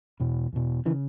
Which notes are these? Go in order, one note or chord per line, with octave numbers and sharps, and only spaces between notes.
E2 B2
E2 B2
C#3 E3